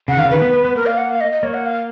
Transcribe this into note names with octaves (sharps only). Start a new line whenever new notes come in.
C#3 F#5
D#3 F5
C#3
D#3 B4
B3
B3
B3
A#3 A#4
F5
F#5
F5
D#5
D#5
A#3 C#5
F#5
F5